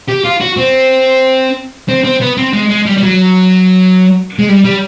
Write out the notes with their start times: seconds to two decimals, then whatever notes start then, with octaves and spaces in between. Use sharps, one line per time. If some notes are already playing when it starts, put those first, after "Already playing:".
0.09 G4
0.25 F4
0.41 F#4
0.58 C4
1.88 C4
2.04 C4
2.21 B3
2.37 C4
2.53 G#3
2.69 G#3
2.86 G3
2.97 G3
3.02 F#3
4.39 G#3
4.49 G3
4.65 G3